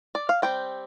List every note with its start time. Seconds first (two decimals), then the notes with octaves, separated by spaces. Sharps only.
0.15 D5
0.29 F5
0.42 G3 C4 G5